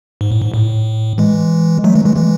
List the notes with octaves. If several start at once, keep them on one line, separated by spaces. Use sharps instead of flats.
G#2
A2
G#2
A2
E3 G#3
F#3 A3
E3 G#3
E3 G#3
E3 G#3